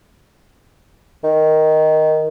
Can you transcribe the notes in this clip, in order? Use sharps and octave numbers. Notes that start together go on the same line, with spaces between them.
D#3